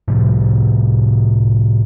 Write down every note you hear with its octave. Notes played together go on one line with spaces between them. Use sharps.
A2 C3 F3 A3